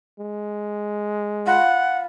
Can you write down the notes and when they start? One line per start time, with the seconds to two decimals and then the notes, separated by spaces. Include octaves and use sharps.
0.20 G#3
1.46 F4 F#5 B5